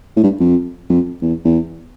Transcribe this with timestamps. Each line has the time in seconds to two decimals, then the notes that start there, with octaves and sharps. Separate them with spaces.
0.17 A2
0.24 G2
0.40 F2
0.90 F2
1.22 E2
1.45 E2